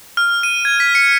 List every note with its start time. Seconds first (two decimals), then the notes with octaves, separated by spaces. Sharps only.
0.17 F6
0.43 D#7
0.65 G#6
0.80 B6
0.95 C#7